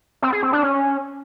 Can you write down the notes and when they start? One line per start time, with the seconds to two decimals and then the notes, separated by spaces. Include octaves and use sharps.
0.22 C4
0.33 G#4
0.43 C4
0.53 D4
0.63 C#4